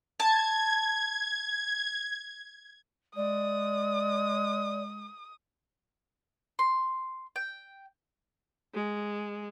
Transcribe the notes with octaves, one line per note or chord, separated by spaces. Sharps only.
A5 G#6
G#3 D5 D#6
C6
G5
G#3